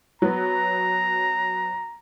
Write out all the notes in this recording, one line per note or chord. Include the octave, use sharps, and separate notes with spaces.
F#3 B3 A#5